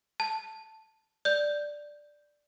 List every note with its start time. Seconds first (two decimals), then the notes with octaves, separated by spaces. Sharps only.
0.20 A5
1.25 D5 G6